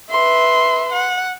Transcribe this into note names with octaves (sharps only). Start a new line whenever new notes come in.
B4 E5 C6
F#5